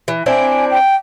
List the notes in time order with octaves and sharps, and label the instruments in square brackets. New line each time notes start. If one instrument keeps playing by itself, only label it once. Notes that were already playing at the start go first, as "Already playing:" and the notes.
[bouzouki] E3
[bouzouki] C4 D4 E4 [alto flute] G#5
[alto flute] G5